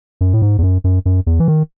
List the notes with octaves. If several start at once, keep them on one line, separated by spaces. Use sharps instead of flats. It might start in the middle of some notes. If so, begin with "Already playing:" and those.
F#2
A2
G#2
E2
F#2
F#2
F#2
E2
E3
D#3